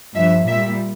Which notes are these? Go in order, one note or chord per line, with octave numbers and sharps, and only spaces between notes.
G2 F3 E5
A#2 G3 E5